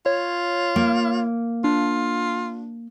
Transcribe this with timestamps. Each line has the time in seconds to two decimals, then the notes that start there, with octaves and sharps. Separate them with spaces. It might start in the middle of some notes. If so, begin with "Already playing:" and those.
0.06 F4 C#5
0.76 A#3
1.64 D4 F4